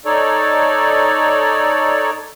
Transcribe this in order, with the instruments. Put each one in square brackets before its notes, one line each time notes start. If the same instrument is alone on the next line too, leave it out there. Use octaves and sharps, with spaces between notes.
[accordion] D#4 A4 C#5 D5